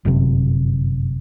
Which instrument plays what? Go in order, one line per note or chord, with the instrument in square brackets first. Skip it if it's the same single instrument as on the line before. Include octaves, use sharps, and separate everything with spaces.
[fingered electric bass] G1 F#2 C3